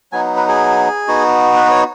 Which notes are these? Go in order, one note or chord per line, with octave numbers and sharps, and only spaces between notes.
F#3 B3 D#4 G#5
B4
G#4
B3 D#4 F#4
B4
C#5